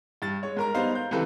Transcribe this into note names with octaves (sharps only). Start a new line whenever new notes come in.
G2 A6
G#3 C#5
G#2 A#4 A#5
G3 B3 D#4 C5 F5
G6
C#2 C3 E3 A4 B4